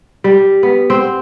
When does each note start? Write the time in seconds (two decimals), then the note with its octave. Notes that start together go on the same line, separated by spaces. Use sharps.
0.24 G3
0.63 B3
0.90 C4